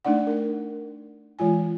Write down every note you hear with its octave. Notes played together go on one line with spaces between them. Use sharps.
A3 D4 D#4 D5 F#5
A#4
E3 G#3 F4 G#5